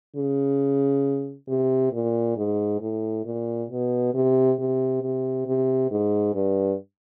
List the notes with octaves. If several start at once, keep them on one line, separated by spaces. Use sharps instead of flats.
C#3
C3
A#2
G#2
A2
A#2
B2
C3
C3
C3
C3
G#2
G2